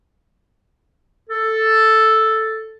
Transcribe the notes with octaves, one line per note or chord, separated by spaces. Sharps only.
A4